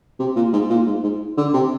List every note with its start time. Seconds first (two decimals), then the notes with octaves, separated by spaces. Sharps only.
0.19 C3
0.36 A#2
0.53 G#2
0.70 A#2
0.86 G#2
1.03 G#2
1.37 D3
1.53 C3